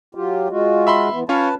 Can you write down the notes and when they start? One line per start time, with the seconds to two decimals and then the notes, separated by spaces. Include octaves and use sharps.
0.15 F#3 F4 G4
0.50 G#3 F4 F#4
0.87 E5 B5 C6
1.12 E3 B3
1.29 C#4 F4 B4 C#5 A5